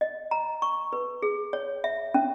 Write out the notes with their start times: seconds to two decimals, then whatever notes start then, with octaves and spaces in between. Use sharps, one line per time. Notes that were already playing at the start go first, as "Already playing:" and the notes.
0.01 D#5
0.31 A#5
0.62 C#6
0.93 B4
1.22 G#4
1.53 C#5
1.84 E5
2.14 C#4